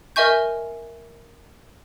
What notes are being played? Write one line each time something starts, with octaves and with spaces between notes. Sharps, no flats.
A#4 D#5 E5 G#5 C#6 G6